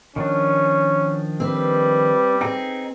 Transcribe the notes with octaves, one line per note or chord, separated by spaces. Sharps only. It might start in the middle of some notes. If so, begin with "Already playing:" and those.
D#3 F3 C#4 D4
G3 C4 B4
C4 D#4 G#4 G5